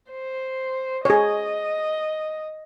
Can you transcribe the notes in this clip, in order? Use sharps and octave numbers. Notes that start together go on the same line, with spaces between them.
C5
G#4 C#5 D#5